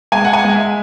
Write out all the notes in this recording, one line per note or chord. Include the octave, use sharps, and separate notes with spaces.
G#3 G#5
F#5
G#5
G#3
E5